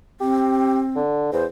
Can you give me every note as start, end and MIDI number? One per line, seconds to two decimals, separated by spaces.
0.20 0.98 60
0.20 0.81 67
0.96 1.31 50
1.32 1.45 40
1.32 1.44 72